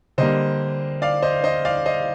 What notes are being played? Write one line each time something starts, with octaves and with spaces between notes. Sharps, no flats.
D3 G3 A#3 C5 D#5
D5 F5
C5 D#5
C5 D#5
D5 F5
C5 D#5